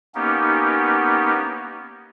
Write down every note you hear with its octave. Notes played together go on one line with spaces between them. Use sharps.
A#3 B3 C#4 D#4 G4